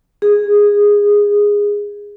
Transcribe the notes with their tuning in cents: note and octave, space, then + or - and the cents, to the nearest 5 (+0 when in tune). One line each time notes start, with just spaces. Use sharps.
G#4 -15